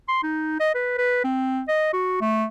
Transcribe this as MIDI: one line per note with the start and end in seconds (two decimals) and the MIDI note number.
0.08 0.21 84
0.23 0.59 63
0.60 0.73 75
0.75 0.98 71
0.98 1.20 71
1.24 1.62 60
1.68 1.89 75
1.93 2.20 66
2.21 2.45 57